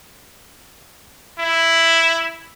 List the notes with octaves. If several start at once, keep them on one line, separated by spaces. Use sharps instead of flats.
E4